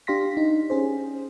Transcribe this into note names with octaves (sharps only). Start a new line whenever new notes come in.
D4 G4 F5 C6 A#6 B6
D#4
C#4 G#4 C5